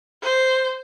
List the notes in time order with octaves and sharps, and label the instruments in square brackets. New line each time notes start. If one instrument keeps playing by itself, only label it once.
[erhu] C5